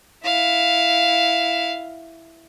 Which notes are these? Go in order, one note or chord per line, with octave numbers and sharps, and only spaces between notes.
E4 F5